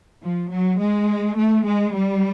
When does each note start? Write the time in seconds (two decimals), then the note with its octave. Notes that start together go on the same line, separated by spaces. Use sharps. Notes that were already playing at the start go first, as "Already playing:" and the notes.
0.23 F3
0.51 F#3
0.79 G#3
1.37 A3
1.67 G#3
1.95 G3